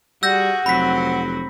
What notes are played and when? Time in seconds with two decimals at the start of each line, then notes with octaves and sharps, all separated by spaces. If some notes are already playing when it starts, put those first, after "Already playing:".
0.23 G3 F#4 G#4 F#5 E6 G6 A#6
0.66 F1 F#3 C4 F#4 B5 B6